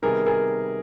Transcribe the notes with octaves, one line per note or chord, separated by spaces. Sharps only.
C3 D#3 G3 B3 G#4 A#4
G#4 A#4